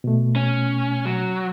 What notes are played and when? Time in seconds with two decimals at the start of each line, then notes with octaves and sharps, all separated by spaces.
0.04 B2 A3
0.36 C#4
1.05 F#3